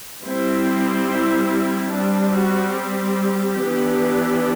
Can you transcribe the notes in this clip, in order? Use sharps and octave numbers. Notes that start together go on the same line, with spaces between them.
G3 C4 E4
E4
E4
G3 C4 D4
F#4
G4
E3 B3 D4